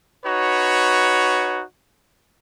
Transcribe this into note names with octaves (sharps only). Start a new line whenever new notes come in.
D#4 F#4 B4 C#5